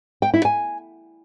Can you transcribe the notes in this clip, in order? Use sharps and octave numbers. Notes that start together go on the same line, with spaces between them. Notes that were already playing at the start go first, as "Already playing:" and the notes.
G5
E4
G#5